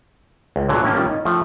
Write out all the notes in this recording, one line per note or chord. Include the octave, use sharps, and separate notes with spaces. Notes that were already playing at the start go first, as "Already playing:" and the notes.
C#2
A#2 D3 F#3 B3
A2 D#3 A#3 C#4
D#3 G3 C#4 F4 G4 A#4
D#4
F3 A3 E5 G5